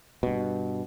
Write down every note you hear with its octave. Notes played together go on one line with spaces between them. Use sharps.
G2 B2